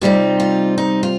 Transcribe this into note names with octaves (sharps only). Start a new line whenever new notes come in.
C3 G3 C4 D#4 F4
F4
D#4
F4